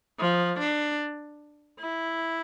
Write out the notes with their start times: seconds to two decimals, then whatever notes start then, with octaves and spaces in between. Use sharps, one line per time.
0.20 F3
0.59 D4
1.80 E4